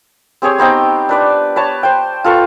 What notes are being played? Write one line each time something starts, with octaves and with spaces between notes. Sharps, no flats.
C4 G4 G#4 C#5
B3 C4 D#4 G5
D4 B4 D5
B4 C#5 A5
C5 G5
F4 A4 B4 C#6